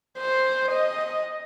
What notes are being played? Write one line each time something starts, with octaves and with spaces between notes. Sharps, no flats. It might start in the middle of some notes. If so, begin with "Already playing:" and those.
C5
D#5